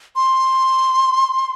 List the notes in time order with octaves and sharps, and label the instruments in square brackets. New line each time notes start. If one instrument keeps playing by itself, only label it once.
[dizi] C6